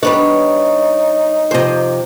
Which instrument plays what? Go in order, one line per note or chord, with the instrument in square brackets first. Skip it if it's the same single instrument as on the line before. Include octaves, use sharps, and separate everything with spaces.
[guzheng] G3 B3 D4 [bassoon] D#4 [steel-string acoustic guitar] C#5
[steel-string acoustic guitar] F2 C3 [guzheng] C5 D#5